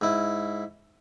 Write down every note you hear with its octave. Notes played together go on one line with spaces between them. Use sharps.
G#2 E4